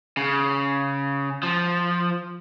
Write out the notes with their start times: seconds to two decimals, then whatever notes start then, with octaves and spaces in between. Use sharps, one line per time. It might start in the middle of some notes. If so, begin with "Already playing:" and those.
0.17 C#3
1.43 F3